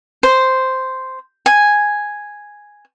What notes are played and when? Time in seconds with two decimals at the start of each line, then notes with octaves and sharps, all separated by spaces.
0.23 C5
1.46 G#5